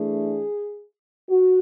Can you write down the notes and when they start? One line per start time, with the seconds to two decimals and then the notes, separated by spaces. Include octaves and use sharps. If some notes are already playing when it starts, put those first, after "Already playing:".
Already playing: E3 A3 D4 G#4
1.29 F#4